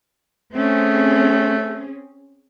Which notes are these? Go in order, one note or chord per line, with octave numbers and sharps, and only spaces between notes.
A3 C4 C#4 G#4